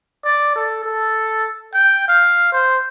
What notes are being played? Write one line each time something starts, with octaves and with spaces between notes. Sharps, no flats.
D5
A4
A4
G5
F5
C5